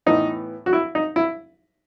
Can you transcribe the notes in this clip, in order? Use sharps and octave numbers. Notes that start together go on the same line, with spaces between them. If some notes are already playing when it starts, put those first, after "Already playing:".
A2 E3 B3 D#4
F#4
E4
D#4
E4